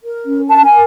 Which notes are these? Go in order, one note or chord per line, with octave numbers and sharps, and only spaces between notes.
A#4
C#4
A#4 A5
G#5